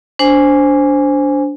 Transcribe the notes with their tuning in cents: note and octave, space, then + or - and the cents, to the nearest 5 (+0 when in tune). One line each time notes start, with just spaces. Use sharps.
D4 -25 C5 +0 G#5 -5